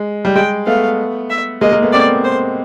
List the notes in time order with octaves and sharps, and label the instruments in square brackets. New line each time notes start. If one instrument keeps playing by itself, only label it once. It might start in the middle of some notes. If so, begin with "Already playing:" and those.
Already playing: [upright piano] G#3
G3
[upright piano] G#3 [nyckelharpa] G5
[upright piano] A3 B3 [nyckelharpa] F5
[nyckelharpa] E5
[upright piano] G#3 A#3 [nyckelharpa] D#5
[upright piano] G#3 A#3
A3 B3
[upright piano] A#3 C4 [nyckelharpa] D5
[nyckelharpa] C5